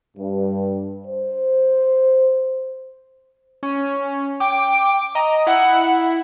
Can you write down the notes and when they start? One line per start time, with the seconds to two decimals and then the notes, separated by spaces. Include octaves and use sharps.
0.17 G2
1.07 C5
3.63 C#4
4.40 G5 D6
5.15 D#5 A#5
5.47 E4 F#5